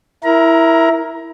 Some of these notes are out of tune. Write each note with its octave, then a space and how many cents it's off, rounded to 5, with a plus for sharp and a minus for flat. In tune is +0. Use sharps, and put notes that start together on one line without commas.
E4 +0 A#4 +0 A#5 +25